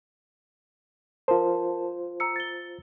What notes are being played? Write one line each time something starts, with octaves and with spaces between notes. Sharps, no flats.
F4 A#4 C5 A5
A#5 E6 C#7
A6 G7